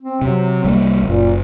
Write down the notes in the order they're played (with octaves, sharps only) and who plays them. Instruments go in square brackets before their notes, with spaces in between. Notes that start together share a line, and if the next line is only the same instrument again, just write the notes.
[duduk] C4
[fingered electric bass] C3 [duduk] F#3
[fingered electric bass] C2 G3 A#3
[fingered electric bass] F#1 [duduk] A#2